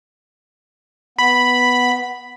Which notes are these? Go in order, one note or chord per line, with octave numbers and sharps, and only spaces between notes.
B3 B5